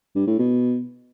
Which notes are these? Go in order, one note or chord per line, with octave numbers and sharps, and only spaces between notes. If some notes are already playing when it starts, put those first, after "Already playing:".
G2
A2
B2